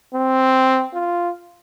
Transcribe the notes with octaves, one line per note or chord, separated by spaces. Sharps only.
C4
F4